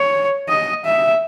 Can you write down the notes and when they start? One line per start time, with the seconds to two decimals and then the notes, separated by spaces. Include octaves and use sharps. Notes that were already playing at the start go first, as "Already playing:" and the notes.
Already playing: C#5
0.49 D#5
0.86 E5